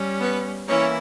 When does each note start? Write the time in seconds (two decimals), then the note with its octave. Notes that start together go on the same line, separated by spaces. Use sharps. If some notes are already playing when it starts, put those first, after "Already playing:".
Already playing: G3 C#4
0.21 B3 B4
0.68 E3 A#3 C#4 E4 C#5